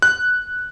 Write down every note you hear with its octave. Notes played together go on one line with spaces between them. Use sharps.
F#6